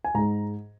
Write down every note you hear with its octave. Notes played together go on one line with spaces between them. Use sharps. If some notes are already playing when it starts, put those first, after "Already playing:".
G#5
G#2 G#3 A#5